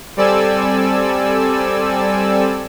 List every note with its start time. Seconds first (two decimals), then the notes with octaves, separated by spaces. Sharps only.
0.17 G3 C4 A4 D5 G#5 E6